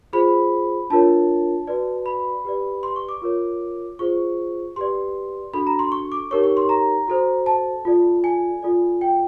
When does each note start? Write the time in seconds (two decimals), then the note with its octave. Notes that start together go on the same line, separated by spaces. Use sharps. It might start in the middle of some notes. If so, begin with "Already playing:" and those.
0.13 F4 G#4 C5 B5
0.90 D4 F4 A#4 C#5 A5
1.67 F#4 B4 D5
2.06 B5
2.45 G4 B4 D5
2.83 C6
2.96 C#6
3.09 D6
3.22 F4 A#4 C#5
3.99 F4 G#4 C5 C#6
4.76 G4 B4 D5 C6
5.53 D4 F#4 A4 B5
5.67 A#5
5.79 C6
5.92 C#6
6.12 D6
6.31 D#4 G4 A#4 C#5 C#6
6.44 C#6
6.57 C6
6.69 A#5
7.08 F#4 A4 C5
7.46 A5
7.85 F4 A4 D5
8.24 G#5
8.63 F4 A4 D5
9.01 G5